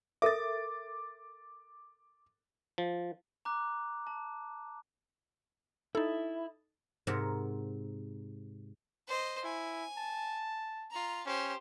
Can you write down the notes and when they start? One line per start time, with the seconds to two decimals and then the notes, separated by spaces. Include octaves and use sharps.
0.22 A4 A#4 E5 D6 A6
2.78 F3
3.45 A#5 D6 F#6
4.07 A5
5.95 D#4 E4 A4
7.07 G#2 C3 A#4 F#5
9.08 C5 D#5
9.44 E4 G#5
9.98 A5
10.91 F4 A#5
11.26 C#4 G4 C5